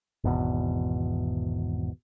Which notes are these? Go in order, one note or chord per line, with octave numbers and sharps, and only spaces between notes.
G#1 E2 B2